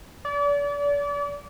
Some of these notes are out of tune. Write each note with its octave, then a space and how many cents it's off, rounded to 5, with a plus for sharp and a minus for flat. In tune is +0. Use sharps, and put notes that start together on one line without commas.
D5 -35